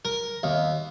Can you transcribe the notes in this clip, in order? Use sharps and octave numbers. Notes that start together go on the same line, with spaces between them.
A#4
D#2